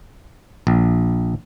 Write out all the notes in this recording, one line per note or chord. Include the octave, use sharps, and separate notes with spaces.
A#1